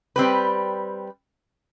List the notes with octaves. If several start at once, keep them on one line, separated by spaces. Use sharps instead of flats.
G3 C4 G4 B4